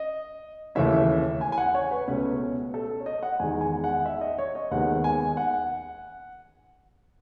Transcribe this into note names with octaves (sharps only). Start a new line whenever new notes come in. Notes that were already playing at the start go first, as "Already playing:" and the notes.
Already playing: D#5
D#2 C#3 E3 A3 C#4 E5
G#5
G#5
F#5
C#5
B4
C#2 B2 A3 C#4 B4
A4
C#5
D#5
F#5
E2 D#3 G#3 G#5
G#5
F#5
E5
D#5
C#5
D#5
D#2 D#3 G#3 B3 F#5
G#5
F#5